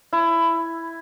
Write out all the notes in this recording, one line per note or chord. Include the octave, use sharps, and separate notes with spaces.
E4